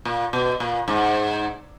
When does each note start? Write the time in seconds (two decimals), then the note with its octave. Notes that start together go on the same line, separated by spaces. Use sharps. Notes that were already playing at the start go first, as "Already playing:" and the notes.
0.05 A#2
0.33 B2
0.60 A#2
0.88 G#2